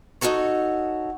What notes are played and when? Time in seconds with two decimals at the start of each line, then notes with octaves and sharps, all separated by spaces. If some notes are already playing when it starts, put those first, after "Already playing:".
0.21 D#4 F4 F#4 A4 C#5